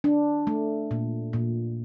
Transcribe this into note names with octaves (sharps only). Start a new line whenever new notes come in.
D4
A3
A#2
A#2